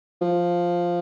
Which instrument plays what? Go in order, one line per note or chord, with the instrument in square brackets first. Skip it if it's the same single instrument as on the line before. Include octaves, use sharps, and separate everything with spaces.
[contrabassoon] F3